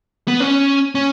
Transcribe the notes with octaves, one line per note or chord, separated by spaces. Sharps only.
B3
C#4
C#4